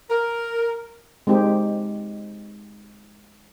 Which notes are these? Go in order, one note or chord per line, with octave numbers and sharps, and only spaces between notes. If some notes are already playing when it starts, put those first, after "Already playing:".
A#4
G#3 C4 D#4 G4